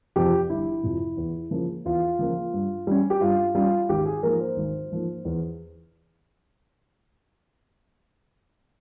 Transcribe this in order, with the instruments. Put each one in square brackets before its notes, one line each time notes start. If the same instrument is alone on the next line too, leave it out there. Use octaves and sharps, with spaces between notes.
[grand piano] F2 C3 F3 G4
G1 E4
F2 C3 F3
E2
C#3 F3 A#3
E2 F4
C#3 F3 A#3
G2
G3 C#4
G4
G2 F4
G3 C#4 F4
G#1 G4
G#4
G#2 F3 A#3 A#4
C5
G#1
G#2 F3 A#3
E2